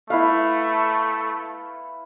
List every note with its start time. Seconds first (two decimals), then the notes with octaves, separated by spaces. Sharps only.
0.10 A3 E4 B4 F5